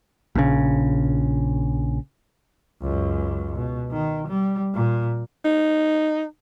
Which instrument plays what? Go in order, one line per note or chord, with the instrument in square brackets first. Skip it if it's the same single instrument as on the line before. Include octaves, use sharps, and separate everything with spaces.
[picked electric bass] A#1 C#3
[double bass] C#2 F#2
B2
D#3
G3
A#2
[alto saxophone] D#4